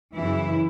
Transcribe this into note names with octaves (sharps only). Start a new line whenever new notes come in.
F#2 C#3 E3 E4